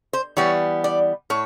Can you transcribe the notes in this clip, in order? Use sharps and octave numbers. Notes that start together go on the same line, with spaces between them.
C5
E3 G3 B3 C#5
D5
A2 C#5